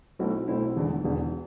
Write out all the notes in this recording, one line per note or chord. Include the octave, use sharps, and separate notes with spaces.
B1 B2 A3 C4 E4
B1 B2 A3 C4 E4
E1 E2 D3
E1 E2 D3